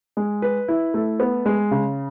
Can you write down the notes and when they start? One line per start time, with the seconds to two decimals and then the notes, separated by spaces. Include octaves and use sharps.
0.17 G#3
0.42 B4
0.68 E4
0.94 A3
1.20 B3
1.46 G#3
1.71 C#3